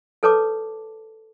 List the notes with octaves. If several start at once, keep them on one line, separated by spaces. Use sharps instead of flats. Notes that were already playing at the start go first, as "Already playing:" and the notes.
A4 B4 C#5 A5 D6